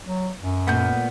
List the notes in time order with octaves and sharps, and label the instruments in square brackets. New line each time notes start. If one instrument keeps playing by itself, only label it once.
[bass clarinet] F#3
F#2
[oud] A#2 A3 [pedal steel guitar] B3 F#5 G6